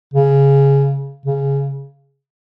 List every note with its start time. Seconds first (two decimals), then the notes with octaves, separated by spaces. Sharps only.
0.14 C#3
1.26 C#3